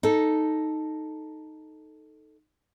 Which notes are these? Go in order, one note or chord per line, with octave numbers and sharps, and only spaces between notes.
D#4 A4